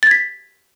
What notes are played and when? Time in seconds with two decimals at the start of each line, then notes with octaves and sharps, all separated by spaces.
0.03 A6
0.07 G#6
0.11 B6